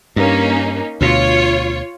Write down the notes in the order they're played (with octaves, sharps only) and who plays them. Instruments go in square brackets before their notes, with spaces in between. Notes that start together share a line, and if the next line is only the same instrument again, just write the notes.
[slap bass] G2 [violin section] A#3 C#4 D#4
[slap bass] D2 B2 [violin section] F4 C#5